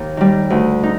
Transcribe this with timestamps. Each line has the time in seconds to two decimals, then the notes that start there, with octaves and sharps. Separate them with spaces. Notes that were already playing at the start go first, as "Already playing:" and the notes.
Already playing: D#2
0.17 D#3 G3
0.50 D2
0.83 D#4